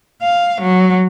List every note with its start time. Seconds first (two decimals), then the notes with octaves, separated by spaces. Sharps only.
0.22 F5
0.61 F#3